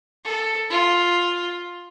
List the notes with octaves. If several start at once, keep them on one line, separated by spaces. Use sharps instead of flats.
A4
F4